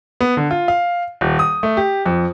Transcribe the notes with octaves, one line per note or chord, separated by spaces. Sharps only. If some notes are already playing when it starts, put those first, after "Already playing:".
B3
D3
F4
F5
D#1
D#6
A3
G4
F2